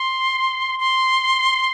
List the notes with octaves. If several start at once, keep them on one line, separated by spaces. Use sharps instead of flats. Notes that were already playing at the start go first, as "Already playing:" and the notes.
Already playing: C6
C6